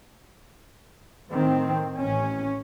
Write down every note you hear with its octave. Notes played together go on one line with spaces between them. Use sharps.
A2 D#3 C4
A1 C#4